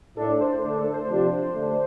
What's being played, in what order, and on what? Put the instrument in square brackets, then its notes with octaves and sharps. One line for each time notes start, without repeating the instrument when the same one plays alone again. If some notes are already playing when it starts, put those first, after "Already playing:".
[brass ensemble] A2 A3 D4 [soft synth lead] A4
[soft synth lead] C5
[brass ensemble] D3 A3 D4
[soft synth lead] A4
C5
[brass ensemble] C3 F3 D4 G4
D3 A3 D4